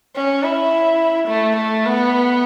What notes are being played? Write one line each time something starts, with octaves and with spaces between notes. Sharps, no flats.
C#4
E4
A3
A3
B3